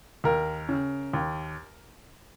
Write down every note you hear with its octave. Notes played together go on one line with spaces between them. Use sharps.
D#2 A#4
C#3
D#2